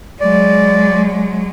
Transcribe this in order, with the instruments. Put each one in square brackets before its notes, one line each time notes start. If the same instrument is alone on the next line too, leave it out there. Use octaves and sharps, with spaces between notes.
[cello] F#3 G#3 [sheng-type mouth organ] D5